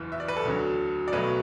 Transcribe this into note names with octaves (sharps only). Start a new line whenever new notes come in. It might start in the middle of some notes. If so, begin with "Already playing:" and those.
Already playing: F#1 E2 E3
E5
D5
B4
A4
D2 D3 F#3
D5
B1 B2 F#3 A3 B4